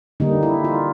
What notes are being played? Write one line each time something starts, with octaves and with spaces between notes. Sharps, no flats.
D3 G3 A#3 D#4
E4
F4